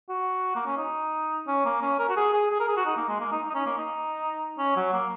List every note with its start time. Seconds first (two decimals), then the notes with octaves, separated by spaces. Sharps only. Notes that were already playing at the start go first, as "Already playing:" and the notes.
0.09 F#4
0.56 A#3
0.66 C#4
0.77 D#4
1.47 C#4
1.65 A#3
1.82 C#4
1.99 A#4
2.09 F#4
2.17 G#4
2.33 G#4
2.51 G#4
2.60 A#4
2.68 G#4
2.77 F#4
2.85 D#4
2.97 A#3
3.09 G#3
3.20 A#3
3.32 D#4
3.50 D#4
3.54 C#4
3.66 A#3
3.78 D#4
4.58 C#4
4.76 F#3
4.93 A#3